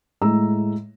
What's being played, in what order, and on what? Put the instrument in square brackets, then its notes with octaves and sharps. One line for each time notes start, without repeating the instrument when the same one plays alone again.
[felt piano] A2 G#3 A#5 E6